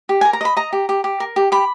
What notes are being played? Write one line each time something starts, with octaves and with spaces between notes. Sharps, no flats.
G4
G#5
A#4
A#5
D#5 B5
D#5 A#5
G4
G4
G4
A#4
G4
G4 B5